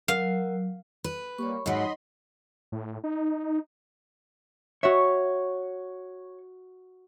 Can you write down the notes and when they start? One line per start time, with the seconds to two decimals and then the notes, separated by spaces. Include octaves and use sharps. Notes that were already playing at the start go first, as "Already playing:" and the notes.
0.08 F#3 A#4 F5 F#5
1.04 B4
1.38 G3 A#3 C#5 B5 C#6
1.66 G#2 F#3 D#4 C#5 D#5 F#5 B5 C6
2.72 A2
3.04 D#4
4.83 F#4 C#5 E5